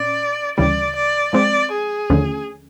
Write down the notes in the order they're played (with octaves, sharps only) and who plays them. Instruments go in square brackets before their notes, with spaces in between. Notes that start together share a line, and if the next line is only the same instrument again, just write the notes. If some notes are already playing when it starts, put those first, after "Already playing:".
Already playing: [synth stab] A#2 C#4 [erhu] D5
[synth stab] D2 C#3 E3 G3 [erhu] D5
[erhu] D5
[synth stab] F3 G#3 C4 [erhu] D5
[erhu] G#4
[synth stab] D#2 D3 F3 A3 C#4